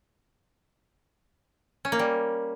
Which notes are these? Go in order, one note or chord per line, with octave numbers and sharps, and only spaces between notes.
C#4
A#3
G3